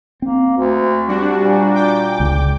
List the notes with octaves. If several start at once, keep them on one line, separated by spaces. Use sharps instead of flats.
A#3 C4
D2
G3 D4 F#4
A#2
G5 D6
C#2